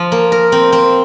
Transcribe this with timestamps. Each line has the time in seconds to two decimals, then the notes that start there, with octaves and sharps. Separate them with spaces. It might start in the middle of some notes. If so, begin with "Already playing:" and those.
Already playing: F3
0.12 A#3
0.32 A#4
0.52 C4
0.72 C4